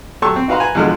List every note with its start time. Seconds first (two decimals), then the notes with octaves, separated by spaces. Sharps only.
0.22 F#3 A3 G4 A5 C#6 E6
0.36 C4
0.48 D#4 F#4 B4 F5 A#5 C6
0.60 B4 G#5 A#5
0.75 E2 B2 D3 F3 G#3 F6